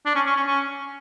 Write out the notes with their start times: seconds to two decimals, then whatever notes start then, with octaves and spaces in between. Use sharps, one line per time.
0.06 D4
0.15 C#4
0.26 C#4
0.36 C#4
0.47 C#4